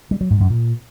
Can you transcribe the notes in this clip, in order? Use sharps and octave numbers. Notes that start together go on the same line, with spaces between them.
G3
F#3
G#2
F#2
A#2